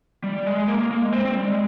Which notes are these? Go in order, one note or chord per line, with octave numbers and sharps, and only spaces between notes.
G3
G#3
A#3
A#3
A#3
G#3
C4
C4
G3
G#3